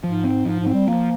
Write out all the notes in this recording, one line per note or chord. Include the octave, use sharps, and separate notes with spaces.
G#2 F3
C4
G#2 F3
G#2
C4
G3
F3 A#3